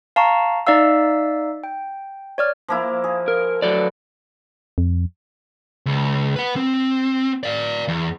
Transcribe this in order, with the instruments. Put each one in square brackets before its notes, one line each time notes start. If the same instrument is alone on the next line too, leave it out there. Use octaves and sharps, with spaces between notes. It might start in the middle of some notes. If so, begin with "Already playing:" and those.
[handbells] F5 A5 A#5 C#6
D#4 D5 E5 F5 E6
G5
C#5 D5 F6
[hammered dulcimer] F3 A#3 E4
G#4
[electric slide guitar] A#4
[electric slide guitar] F#3 A4 D5 [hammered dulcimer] B4
[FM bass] F2
[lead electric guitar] C#2
B4 F#5
C4
D5 F5
E2